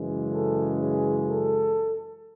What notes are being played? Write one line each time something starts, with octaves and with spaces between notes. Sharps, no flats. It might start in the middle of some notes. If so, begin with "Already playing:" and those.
Already playing: F#2 C#3 E3 G#3
A4
G#4
A4